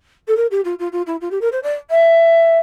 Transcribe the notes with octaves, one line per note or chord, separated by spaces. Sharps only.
A4
A#4
G4
F4
F4
F4
E4
F4
G4
A#4
C5
D5
E5